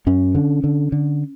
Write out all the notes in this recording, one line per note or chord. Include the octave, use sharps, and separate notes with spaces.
F#2 C#4
D3
D3
D3